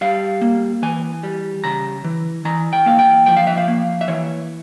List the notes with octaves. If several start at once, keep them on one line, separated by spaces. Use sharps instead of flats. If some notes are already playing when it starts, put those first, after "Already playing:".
G3 F5
A#3
E3 G#5
G3
C#3 A#5
E3
E3 A#5
G5
A#3 F5
G5
F3 G5
F5
E5
F5
A#3
E5
E3 C#5